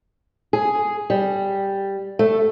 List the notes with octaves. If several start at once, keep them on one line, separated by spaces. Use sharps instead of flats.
G#4
G3
A3